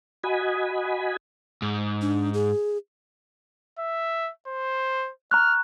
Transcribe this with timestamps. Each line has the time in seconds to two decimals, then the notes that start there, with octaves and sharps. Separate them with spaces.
0.24 F#4 D#5 G#5 B5
1.62 G#2
2.01 D4
2.34 G#4
3.79 E5
4.47 C5
5.31 A#5 C#6 F6 F#6